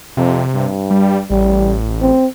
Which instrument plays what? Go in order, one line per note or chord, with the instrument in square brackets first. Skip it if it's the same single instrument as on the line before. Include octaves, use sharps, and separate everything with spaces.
[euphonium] F2 [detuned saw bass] C3
[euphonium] G2
[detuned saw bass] G3
[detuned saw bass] A1 [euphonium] G3
[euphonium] C4